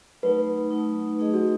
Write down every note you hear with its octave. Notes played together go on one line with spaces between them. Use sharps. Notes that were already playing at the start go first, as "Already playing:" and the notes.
F#3 A3 D#4 B4
F#3 A3 D#4
A3 D#4 G#4 D#5
F#4